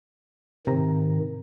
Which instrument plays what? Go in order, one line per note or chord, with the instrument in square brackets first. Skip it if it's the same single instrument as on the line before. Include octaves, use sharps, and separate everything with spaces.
[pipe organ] G#2 D#3 [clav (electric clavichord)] C3 A#5